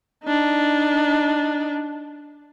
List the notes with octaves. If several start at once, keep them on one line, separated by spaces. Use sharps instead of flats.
D4 D#4